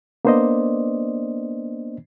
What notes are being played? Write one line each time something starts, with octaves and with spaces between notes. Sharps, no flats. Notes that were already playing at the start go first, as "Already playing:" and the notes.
A#3 B3 D4 C5 D5 D#5